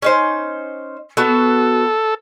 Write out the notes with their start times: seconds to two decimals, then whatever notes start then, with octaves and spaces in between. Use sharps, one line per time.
0.02 C#4 D#4 C5
1.17 B3 F#4 A4